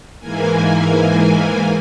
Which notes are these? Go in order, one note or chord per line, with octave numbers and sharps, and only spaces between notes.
G#2 E3 A#3 G#5